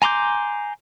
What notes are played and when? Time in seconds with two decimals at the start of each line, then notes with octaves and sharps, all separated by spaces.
0.02 G#5 A#5 C6 D6 G6